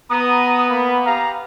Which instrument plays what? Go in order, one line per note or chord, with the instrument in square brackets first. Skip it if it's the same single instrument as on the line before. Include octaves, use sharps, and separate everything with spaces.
[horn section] B3 [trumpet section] A#5 D#6
[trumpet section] A#3 B5
G4 F5 A#5